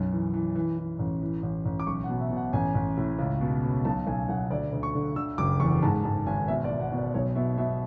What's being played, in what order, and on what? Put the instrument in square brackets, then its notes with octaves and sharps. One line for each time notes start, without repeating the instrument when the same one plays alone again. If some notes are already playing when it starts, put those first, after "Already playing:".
Already playing: [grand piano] B1 F#2
E3
E3
E3
E3
A1
E3
A1
A1
D6
B1 C#6
F#5
B2
E5
B2
F#5
A1 G#5
A1
A2
C#2
B2
B2
B1 A5
B1 G#5
B1 F#5
D2 D5
D2
C#6
D3
D3 E6
F#1 D6
E2 C#6
G#2 A5
G#2 A5
G#1 G#5
B2 E5
D5
B2
F#5
B2
D5
B1 C#5
B2 E5
B2 E5